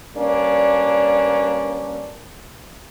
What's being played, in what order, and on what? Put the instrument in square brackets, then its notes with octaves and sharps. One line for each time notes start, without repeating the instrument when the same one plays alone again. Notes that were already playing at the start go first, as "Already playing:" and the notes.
[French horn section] G2 A#3 C#4 D4